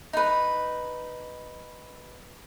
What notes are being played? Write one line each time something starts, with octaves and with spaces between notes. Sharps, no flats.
D#4 B4